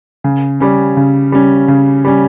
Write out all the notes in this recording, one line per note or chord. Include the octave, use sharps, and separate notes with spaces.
C#3
G3 C#4
C#3
G3 C#4
C#3
G3 C#4